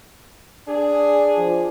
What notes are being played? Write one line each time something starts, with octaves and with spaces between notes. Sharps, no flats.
D4 G#4
F3